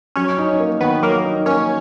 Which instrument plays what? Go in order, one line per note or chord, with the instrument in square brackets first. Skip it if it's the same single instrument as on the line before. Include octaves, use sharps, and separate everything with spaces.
[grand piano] F#3 [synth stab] C#4 C#5
[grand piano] D#4
A#3
[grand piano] D#3 [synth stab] B3 B4
[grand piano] F#3 [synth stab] A#3 A#4
[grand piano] D#4
[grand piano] A#3 [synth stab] C#4 C#5